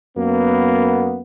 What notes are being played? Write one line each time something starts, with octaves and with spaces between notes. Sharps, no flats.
F#2 A#3 B3